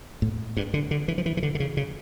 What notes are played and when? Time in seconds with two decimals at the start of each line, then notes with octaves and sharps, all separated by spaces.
0.22 A2
0.57 G2
0.74 D3
0.91 D3
1.08 E3
1.18 F3
1.26 E3
1.37 E3
1.43 D3
1.55 D3
1.60 C#3
1.77 C#3